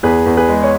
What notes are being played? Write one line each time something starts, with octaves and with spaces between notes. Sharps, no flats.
E2 G#4 B4
E2
G#4 B4
G#3
C#5